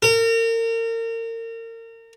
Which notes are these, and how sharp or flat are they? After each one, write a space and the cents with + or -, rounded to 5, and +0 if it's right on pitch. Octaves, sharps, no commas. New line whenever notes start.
A#4 -35